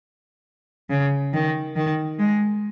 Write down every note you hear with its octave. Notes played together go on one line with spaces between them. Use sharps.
C#3
D#3
D#3
G#3